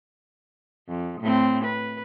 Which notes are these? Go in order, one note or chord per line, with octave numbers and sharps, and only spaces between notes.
F2
A2 C4
B4